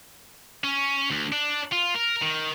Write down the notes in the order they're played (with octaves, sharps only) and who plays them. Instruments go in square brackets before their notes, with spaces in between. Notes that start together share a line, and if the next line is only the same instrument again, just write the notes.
[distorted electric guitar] C#4
D2
D4
F4
A#4
D#3